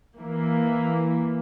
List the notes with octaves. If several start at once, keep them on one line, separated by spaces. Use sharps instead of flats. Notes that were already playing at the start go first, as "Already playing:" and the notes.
E3 A#3